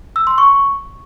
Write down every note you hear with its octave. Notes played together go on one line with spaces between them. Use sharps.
E6
C6
C#6